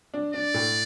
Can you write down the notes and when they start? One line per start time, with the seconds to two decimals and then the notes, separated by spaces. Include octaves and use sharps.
0.14 D4
0.34 D4 D5
0.54 A2